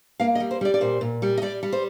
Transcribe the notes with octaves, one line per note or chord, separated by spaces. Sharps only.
A#3 F5
D#5
G3
C5
G3 D5
D5
A#2 C5
A#2
G3
D#5
G3 D5
G3
C5